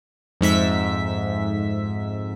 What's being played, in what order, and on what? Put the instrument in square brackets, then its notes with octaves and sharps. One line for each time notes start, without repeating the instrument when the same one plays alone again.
[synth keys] F2 G#2 E5 B6